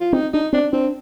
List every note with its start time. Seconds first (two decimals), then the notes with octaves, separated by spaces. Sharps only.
0.01 F4
0.13 C4 D#4
0.33 D4 D#4
0.53 C4 D4
0.73 C4 D4